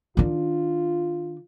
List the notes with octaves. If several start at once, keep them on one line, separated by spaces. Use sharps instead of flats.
D#3 D4 F4